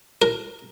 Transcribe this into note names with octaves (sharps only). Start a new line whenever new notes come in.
A#4